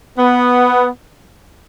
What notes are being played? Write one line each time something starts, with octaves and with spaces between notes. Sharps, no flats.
B3